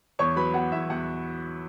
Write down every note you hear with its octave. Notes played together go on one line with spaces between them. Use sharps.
E2 C#5 C#6
F#3 B4 B5
B3 F#4 F#5
E2 E4 E5
E2 F#4 F#5